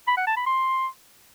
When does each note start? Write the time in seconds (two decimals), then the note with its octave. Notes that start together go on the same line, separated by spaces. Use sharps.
0.07 B5
0.17 F#5
0.27 A5
0.37 B5
0.46 C6